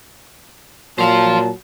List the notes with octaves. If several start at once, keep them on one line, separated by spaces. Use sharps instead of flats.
A#2 F#3 C5 F5 A5